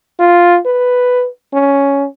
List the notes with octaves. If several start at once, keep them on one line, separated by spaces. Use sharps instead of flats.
F4
B4
C#4